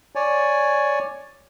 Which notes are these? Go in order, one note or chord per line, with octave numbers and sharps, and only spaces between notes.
C#5 D5 G#5